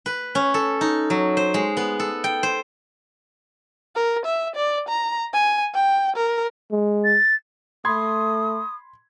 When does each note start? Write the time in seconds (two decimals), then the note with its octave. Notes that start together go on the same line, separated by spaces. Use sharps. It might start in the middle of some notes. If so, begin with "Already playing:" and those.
0.06 B4
0.35 C#4
0.54 A4
0.81 D#4
1.10 F#3
1.37 C5
1.54 G#3
1.77 B3
2.00 A4
2.24 G5
2.43 C5
3.96 A#4
4.25 E5
4.55 D5
4.88 A#5
5.34 G#5
5.74 G5
6.16 A#4
6.71 G#3
7.05 A6
7.85 A3 B5 C6 D#6 G#6